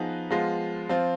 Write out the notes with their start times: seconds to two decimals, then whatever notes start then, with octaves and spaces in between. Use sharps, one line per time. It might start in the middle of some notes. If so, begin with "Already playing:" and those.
Already playing: F3 B3 D#4 G#4 B4
0.31 F3 G#3 B3 F4
0.89 F3 C4 F4